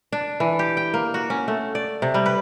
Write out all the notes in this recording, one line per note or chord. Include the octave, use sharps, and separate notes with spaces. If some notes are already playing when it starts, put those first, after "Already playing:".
D4
E3
G4
G5
A#3
F#4
C#4
A3
D5
C3
G3
B4